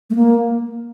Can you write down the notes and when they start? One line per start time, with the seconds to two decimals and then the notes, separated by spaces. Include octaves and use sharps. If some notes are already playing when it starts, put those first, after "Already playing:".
0.10 A3
0.15 A#3